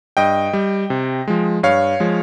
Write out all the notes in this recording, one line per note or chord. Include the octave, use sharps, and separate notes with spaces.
G2 D#5 G5
G3
C3
F3 G#3
G2 C#5 F5
F3 G#3